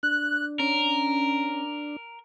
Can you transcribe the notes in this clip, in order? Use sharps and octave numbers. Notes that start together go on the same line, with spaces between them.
D4 F#6
C#4 A#4